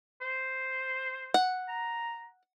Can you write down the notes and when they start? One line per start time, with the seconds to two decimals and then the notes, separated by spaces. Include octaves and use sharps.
0.21 C5
1.34 F#5
1.69 A#5